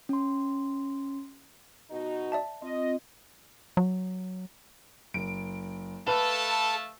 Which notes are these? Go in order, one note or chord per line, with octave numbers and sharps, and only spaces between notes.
C#4 C6
B2 D#4 F#4
D5 E5 A5
C4 F4 D#5
F#3
F#1 D7
A3 A4 B4 F5 A5